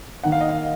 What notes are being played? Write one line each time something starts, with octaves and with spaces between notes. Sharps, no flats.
D#3 A#3 D#4 F#5
F5
D#5
F5